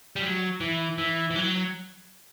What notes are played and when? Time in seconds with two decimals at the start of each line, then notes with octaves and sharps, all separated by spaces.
0.16 G3
0.22 F#3
0.61 E3
0.98 E3
1.31 E3
1.36 F#3